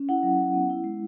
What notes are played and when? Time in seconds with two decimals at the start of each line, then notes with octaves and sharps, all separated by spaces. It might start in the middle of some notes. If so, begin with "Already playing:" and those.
Already playing: C#4
0.09 E4 F#5
0.23 F#3
0.39 F#3
0.53 B3
0.70 E4
0.84 G#3